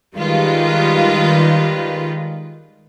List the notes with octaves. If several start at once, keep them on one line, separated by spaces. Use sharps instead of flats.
D#3 G3 G#3 F4 B4